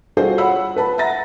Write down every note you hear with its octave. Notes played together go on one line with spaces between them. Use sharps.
G3 F4 F#4 G#4 A4 C5
F4 C#5 F#5 B5 E6
B4 A5 B5
E5 F#5 A#5 A6 A#6